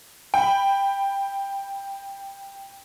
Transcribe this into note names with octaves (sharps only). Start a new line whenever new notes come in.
G5 B5